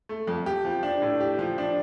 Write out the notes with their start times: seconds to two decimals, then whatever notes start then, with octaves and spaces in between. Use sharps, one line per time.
0.09 A3
0.27 F2
0.46 G4
0.65 F3
0.83 D4
1.02 A2
1.21 G4
1.39 F3
1.58 D4